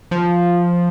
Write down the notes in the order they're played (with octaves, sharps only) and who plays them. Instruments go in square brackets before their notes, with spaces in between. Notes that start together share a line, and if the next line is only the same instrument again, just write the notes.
[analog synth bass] F3